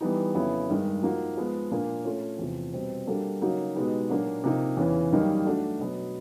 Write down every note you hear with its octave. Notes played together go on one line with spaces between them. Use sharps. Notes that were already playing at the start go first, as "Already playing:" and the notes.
E3 G3 B3 D#4
F2 C#3 F#3 B3 E4
G2 D#3 G#3
F3 A#3 D#4 F#4
F3 G#3 B3
A#2 F3 A#3 D4
A3 C#4 F4
E2 C3 F3
B2 G3 C4
G3 A#3 D4 F#4 A4
C#3 F#3 A#3 D#4 F#4
B2 G#3 B3 D#4 G4
A#2 F#3 A#3 D4 F#4
C3 F3 A#3 D#4
E2 C#3 E3
F#2 D#3 G3 A#3 D#4
A3 D4 F#4
B2 F#3 B3